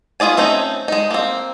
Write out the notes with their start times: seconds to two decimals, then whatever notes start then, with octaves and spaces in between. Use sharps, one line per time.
0.20 B3 F4 G#4 D5 G#5
0.37 A3 C4 C#4 D#4
0.88 G#3 D#4
1.11 A#3 C4